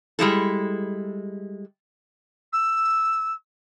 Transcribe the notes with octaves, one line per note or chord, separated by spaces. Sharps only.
G3 G#3 E4 A4
E6